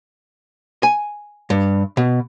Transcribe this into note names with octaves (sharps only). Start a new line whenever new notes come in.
G#5
G2
B2